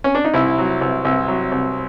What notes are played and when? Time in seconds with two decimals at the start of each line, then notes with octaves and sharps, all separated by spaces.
0.04 C#4
0.15 D4
0.25 D#4
0.34 C2 E4
0.58 F#3
0.81 C2
1.05 C2
1.28 F#3
1.52 C2